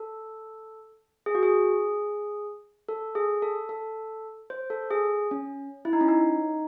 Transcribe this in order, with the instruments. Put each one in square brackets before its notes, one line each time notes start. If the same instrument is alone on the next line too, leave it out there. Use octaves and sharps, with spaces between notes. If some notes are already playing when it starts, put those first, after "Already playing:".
Already playing: [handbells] A4
G#4
F#4
G#4
A4
G#4
A4
A4
C5
A4
G#4
C#4
E4
D#4
C#4
D#4